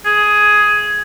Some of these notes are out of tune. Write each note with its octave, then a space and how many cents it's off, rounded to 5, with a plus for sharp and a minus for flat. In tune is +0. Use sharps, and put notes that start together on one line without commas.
G#4 +10